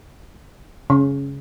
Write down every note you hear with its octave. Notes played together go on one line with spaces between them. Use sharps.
C#3